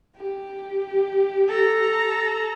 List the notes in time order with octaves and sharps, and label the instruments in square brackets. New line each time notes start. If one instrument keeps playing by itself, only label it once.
[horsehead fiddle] G4
[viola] A4 A#5